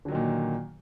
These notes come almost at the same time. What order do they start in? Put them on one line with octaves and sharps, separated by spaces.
D3 F#3 D#3 A#2